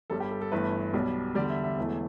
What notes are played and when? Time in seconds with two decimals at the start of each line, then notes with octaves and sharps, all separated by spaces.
0.10 G1 G2 G3 A4
0.20 G4
0.31 A4
0.42 A4
0.52 G1 G2 E3 A3 B4
0.94 B1 B2 G3
1.35 E2 D3 G3 D5
1.50 E5
1.64 E5
1.77 E1 E2 E3 A3